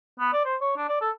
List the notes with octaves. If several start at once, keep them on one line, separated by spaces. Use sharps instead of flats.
B3
D5
C5
C#5
D4
D5
A4